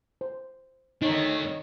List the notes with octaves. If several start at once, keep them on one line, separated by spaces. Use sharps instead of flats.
C5
D#3 A3 D4 D#4 C#5